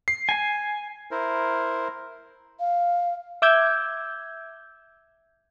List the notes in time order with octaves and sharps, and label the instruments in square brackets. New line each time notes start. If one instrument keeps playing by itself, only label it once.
[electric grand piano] C7
[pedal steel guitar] G#5
[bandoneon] E4 A#4 C5
[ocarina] F5
[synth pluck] E5 D6 E6 G6 G#6